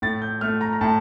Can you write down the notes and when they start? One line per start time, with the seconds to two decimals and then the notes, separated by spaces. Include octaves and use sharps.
0.02 A2 A6
0.22 G6
0.41 A3 F6
0.61 A#5
0.73 A#5
0.81 A2 A5